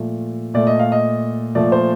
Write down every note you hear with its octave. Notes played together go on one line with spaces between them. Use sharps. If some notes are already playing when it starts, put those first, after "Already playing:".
Already playing: A#2 F3 A3
A#2 A3 D5
D#5
F5
D#5
A#2 F3 A3 D5
C5